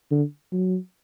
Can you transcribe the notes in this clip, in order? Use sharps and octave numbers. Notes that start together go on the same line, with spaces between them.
D3
F#3